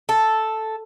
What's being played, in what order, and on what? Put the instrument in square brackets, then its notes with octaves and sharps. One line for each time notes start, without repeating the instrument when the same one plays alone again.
[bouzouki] A4